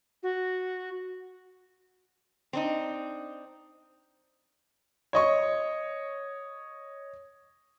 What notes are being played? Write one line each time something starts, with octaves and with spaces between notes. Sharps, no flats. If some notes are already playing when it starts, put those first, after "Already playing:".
F#4
C4 D4 D#4
C#5 D#5 C#6